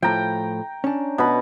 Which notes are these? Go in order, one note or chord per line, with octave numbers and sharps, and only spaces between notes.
A2 F3 G5 A#5
C#4 D4
B2 B5